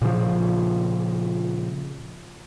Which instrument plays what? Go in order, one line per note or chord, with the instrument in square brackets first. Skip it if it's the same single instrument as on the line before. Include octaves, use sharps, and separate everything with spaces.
[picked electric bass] A#2 C#3 F3